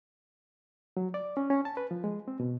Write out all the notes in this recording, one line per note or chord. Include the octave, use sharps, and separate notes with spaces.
F#3
D5
C#4
C#4
A5
B4
F3
G#3
C4
B2